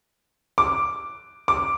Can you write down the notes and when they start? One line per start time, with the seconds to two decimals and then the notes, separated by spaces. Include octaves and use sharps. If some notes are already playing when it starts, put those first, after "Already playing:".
0.58 D6
1.48 D6